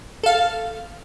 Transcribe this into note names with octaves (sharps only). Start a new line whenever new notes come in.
A4 F5